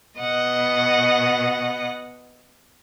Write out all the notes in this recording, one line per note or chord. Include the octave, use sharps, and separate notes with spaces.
B2 D#5 F#5